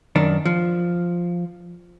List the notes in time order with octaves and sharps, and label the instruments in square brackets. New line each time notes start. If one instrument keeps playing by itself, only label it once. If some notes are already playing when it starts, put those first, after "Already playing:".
[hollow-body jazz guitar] F#2 D#3 D4
F3